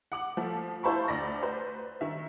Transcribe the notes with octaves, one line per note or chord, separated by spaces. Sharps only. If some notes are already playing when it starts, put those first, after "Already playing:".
F#5 D6 F#7
F3 A3
E4 F4 C5 A5 B5 C#6
D2 D5 B5 A#6
B4 C5
D#3 E5